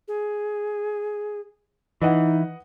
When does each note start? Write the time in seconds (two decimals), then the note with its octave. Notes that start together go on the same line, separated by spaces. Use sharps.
0.08 G#4
2.02 E3 D#4 B4 D#5 F#5